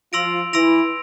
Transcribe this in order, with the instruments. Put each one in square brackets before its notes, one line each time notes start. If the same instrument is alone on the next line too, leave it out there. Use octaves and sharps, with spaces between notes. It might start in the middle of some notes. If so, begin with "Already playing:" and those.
[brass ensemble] F3 F4 [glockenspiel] C6 E6 A#6 D7 F7
[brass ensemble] E3 E4 [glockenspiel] C6 E6 A#6 D7 F7